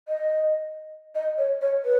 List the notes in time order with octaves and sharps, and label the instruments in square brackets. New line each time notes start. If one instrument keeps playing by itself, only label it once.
[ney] D#5
D#5
C#5
C#5
B4